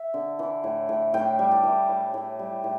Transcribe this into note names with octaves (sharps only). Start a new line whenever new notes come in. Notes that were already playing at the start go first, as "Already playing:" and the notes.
Already playing: E5
D3
E3
A2
A2
A2 G5
G3
A5
E3
A2
A2
G3
A2